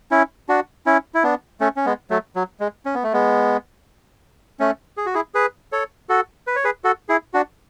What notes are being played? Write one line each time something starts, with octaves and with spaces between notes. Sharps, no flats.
C#4 E4
D4 F#4
C#4 E4
E4
B3 D4
A3 C#4
C#4
G#3 B3
F#3 A3
F#3
G#3
C#4
B3
A3
G#3 B3
A3 C#4
G#4
F#4
E4 G#4
G#4 B4
A4 C#5
F#4 A4
B4
C#5
G#4 B4
F#4 A4
E4 G#4
D4 F#4